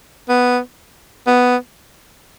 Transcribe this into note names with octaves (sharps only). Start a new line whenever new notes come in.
B3
B3